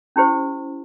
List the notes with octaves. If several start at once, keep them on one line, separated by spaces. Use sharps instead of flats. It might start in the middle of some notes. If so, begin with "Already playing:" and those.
C#4 E4 G4 C5